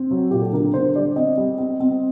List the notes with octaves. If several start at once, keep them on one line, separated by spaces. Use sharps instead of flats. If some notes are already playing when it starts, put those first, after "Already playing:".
Already playing: C4
F#3
A#2 G4
A4
D3 A#4
D3 C5
G3 D5
C4 D#5
G3
C4
C4